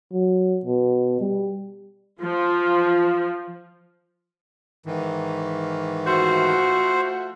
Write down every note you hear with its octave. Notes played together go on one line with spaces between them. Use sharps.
F#3
B2
G3
F3
G#2 D#3 E3
F3 A3 F#4 C5